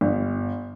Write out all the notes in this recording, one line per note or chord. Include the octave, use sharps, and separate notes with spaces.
G1